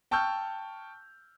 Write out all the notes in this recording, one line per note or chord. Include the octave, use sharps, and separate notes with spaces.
G5 A5 C#6 E6 F6 G6